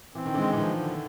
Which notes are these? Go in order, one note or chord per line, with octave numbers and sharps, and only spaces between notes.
E3 C4
D#3
D3 E3 G#3
E3
D#3 F3
D3